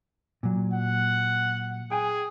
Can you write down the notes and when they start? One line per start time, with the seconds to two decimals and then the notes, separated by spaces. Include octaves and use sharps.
0.43 A#2 F#3
0.74 F#5
1.91 G#4 G5 G#5